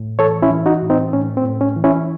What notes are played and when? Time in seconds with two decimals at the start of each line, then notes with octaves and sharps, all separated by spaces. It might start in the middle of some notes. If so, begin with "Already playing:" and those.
Already playing: A2
0.19 E3 A4 C#5
0.42 C#4 E4
0.50 E3
0.66 D#4 F#4
0.82 A2
0.90 C4 D#4
1.13 A2 C#4
1.37 C4
1.45 A2
1.61 C#4
1.76 E3
1.84 C#4 E4